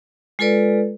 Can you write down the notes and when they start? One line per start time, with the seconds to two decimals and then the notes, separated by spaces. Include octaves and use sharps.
0.39 G#3 F4 A4 B4 D5